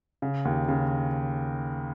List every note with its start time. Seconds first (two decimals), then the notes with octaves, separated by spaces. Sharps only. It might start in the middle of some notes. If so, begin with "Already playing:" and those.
0.22 C#3
0.45 D#2
0.68 C#3